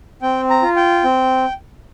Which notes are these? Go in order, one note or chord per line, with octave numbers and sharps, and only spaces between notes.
C4 G5
A#5
F4
G5
C4